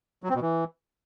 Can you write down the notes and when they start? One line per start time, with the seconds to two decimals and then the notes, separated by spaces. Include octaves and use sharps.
0.23 F#3
0.29 C4
0.35 B2
0.41 E3